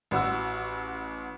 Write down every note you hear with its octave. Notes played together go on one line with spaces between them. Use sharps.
A1 F#4 E6